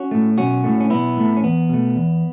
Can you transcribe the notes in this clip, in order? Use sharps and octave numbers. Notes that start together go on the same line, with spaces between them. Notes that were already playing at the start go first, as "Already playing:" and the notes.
Already playing: C#4 F#4
A2 A3
B1 C#4 F#4
A2 A3
C#4
B1 B3 E4
A2 A3
C#4
E2 B3
B2 A3
E2